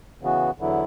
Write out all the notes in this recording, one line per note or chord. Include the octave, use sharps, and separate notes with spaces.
C#3 E3 B3 F#4
E2 D3 F#3 B3 E4